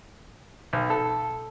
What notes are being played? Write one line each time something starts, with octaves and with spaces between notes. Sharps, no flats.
B1
A4